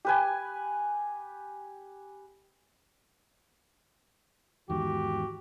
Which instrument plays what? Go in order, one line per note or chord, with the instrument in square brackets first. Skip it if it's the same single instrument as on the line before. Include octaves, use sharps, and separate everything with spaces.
[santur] G4 B4 G#5
[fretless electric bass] E2 G#2 D#3 [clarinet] F#4 [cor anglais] G4